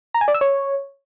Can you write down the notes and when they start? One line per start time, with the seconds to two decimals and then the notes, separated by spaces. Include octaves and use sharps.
0.14 A#5
0.21 G#5
0.28 D5
0.34 E6
0.41 C#5